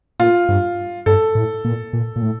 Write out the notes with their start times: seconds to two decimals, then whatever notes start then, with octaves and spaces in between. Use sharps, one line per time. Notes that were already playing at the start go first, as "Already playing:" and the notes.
0.20 A#2 F4
0.49 G2
1.06 G2 A4
1.35 A2
1.64 A#2
1.93 A#2
2.16 A#2
2.22 A2